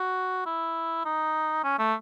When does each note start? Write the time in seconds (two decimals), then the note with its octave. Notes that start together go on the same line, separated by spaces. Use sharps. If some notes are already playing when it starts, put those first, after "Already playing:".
Already playing: F#4
0.46 E4
1.05 D#4
1.64 C#4
1.79 A3